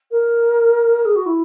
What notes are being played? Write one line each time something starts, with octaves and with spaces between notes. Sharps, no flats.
A#4
G#4
F#4
E4